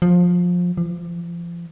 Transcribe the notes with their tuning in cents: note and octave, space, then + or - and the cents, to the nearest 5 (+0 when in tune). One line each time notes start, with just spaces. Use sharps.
F3 +20
F3 -35